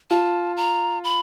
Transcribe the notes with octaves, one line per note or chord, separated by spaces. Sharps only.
F4 A5
A#5
B5